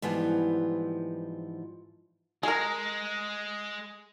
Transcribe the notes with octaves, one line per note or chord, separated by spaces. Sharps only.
G#2 E3 F3 G3 B3
G#3 G#4 A#4